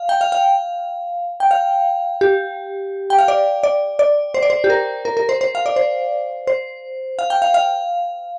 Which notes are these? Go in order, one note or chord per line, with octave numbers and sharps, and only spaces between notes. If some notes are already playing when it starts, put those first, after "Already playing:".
Already playing: F5
G5
F5
F5
G5
F5
G4
G5
F5
D5
D5
D5
C5
D5
C5
G4
A#4
A#4
A#4
C5
C5
F5
D5
C5
C5
F5
G5
F5
F5